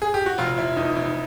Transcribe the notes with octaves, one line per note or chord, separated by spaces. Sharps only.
G#4
G4
F#4
F1 F4
F1 E4
E2 D#4
E4
F1 D#4